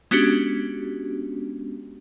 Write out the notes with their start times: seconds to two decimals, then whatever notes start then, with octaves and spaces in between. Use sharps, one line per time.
0.11 G#3 B3 C#4 D4 F#4 G4